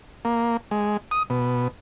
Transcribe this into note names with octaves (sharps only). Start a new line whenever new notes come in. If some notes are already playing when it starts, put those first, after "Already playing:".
A#3
G#3
D#6
B2